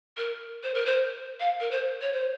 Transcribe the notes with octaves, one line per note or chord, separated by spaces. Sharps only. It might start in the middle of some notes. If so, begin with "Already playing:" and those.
A#4
C5
A#4
C5
F5
A#4
C5
C#5
C5